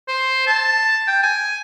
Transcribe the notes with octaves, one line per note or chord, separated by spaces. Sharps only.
C5
A5
G5
G#5